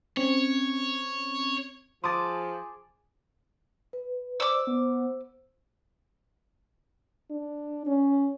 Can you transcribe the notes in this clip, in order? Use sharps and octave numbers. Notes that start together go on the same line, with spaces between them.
C4 C#4 C#5
F3 G#4 A5 C6 D6 D#6
B4
C5 D5 D6 E6
B3 C5
D4
C#4